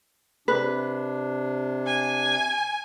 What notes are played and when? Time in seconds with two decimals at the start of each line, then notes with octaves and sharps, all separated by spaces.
0.48 C3 D4 B4
1.86 G#5